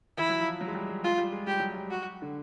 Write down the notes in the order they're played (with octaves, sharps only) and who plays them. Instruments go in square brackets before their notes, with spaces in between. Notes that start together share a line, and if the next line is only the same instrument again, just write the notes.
[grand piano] E3 [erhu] E4
[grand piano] F#3
F3
F#3
G#3
G3
G#3
[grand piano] G#3 [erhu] F4
[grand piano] G3
G#3
[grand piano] G3 [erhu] G4
[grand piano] F#3
G3
[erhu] F#4
[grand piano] D3